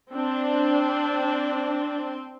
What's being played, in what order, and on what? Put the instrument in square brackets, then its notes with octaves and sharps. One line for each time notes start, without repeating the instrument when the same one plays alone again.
[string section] C4 [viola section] D4